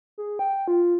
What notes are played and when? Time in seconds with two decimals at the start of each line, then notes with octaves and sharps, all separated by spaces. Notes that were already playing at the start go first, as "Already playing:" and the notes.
0.18 G#4
0.39 G5
0.68 F4